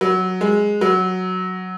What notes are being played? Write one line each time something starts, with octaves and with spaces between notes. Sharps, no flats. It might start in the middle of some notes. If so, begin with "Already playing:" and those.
F#3
G#3
F#3